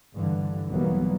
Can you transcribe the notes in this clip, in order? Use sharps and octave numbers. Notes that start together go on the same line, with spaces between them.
G2 D3 E3
B1 E3 F#3 G3 A#3 B3